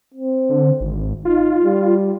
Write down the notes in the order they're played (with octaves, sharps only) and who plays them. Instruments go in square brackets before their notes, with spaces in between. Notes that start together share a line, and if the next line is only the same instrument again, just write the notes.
[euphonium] C4
[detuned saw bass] D3
G#1
[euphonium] D#4 [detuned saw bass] F4
[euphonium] G3